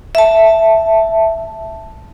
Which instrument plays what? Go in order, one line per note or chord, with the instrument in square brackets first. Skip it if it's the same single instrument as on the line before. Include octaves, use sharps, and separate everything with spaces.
[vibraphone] E5 A5